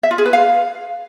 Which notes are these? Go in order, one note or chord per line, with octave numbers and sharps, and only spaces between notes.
E5
F4
G#4
B4
F5